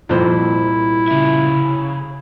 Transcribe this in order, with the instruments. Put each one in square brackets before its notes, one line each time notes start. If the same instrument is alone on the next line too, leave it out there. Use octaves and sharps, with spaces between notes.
[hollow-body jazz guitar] C2 A#2 C5 [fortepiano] F2 [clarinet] E4
[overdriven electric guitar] C#3 E5